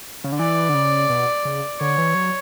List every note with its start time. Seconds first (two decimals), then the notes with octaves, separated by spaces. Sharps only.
0.24 C#3
0.32 D3
0.39 E3 D5
0.69 D3
0.74 C#3
1.10 B2
1.45 C#3
1.80 D3 C#5
1.98 E3
2.14 F#3